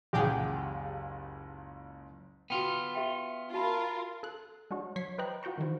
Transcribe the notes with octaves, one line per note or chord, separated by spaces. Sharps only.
F#1 C#2 G4 G#4 F#5
B3 F4 F#4 G5
G4 E5 G5
F4 F#4 A#4 A5 B5
A4 F#6
G#3 D4 F#4 C#5
F#3 C#5 C#6 G#6 B6 C7
B4 C5 D#5 G5 A#5 F#6
F4 F#4 G5 A#5 C#6
D#3 E3 F#4 C5